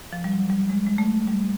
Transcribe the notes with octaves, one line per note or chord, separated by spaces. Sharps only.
F3
G3
F#3
G3
G#3
G#3
A3
G3